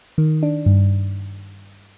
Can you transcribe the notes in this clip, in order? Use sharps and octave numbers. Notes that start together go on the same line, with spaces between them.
D#3
D4
G2